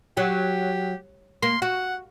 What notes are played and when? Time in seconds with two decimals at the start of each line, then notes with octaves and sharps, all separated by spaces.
0.17 F#3 G4
1.43 A#3 C6
1.62 F#4 F#5